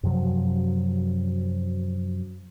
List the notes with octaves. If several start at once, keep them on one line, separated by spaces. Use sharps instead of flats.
F#2 C3 F3 F#3